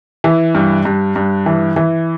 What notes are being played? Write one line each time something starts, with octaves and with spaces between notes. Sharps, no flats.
E3
G2
G2
G2
E3
E3